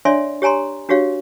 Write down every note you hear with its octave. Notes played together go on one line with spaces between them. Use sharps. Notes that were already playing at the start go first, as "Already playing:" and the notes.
D4 C#5 D5 E5 G#5 C6
G4 C#5 G#5 A#5 C6
D4 F#4 G4 C#5 F5